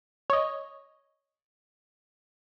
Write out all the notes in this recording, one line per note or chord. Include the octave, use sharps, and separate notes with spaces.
C#5 D#5